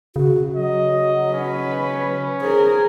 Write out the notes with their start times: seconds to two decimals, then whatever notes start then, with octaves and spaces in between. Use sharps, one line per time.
0.16 C#3 F#4
0.56 F#3 D#5
1.33 C#4 B4
2.41 G#4 A#4 C5